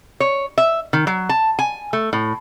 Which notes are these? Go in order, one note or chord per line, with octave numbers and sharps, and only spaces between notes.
C#5
E5
D#3
F#3
A5
G#5
A3
A2